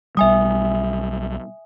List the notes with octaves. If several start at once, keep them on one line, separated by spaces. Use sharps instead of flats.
B1 G3 E5 G#5 D#6